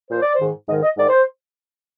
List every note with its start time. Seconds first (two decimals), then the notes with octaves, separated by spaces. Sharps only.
0.10 A#2 F3 C5
0.22 D5
0.34 C5
0.39 G#2 D#3
0.68 G#2 D#3 D#5
0.83 D#5
0.97 G#2 D#3 D5
1.09 C5